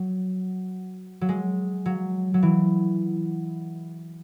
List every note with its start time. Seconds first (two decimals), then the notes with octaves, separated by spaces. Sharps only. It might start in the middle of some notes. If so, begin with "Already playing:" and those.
Already playing: F#3
1.21 F#3
1.29 G#3
1.86 F#3
2.34 F#3
2.43 E3